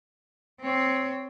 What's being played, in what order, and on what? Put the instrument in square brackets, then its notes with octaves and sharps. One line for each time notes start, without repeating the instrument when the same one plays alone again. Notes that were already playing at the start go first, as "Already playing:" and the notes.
[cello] C4 C#5